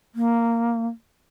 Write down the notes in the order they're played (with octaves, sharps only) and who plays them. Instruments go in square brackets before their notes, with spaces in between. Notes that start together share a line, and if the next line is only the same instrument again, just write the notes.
[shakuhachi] A#3